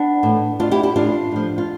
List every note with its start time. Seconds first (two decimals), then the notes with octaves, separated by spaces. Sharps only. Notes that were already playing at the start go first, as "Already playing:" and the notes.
Already playing: B3 D4
0.23 A2 E3
0.59 B2 D4 F4
0.71 E4 G4
0.83 E4 G4
0.96 A2 E3 D4 F4
1.32 A2 F3
1.58 F4